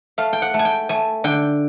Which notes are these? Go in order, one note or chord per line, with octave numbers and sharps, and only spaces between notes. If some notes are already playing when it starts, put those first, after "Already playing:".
A3 F5
G5
F#5
A3
G#5
G5
A3 G#5
D3 G5